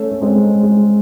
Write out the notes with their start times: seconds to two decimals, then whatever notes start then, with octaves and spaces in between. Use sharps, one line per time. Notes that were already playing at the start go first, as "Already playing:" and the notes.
Already playing: A3 C#4
0.11 A3
0.21 G#3 C4
0.63 G#3